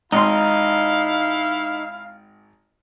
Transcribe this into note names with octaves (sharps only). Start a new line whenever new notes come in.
G#1 G#2 D#4 E4 F5 C6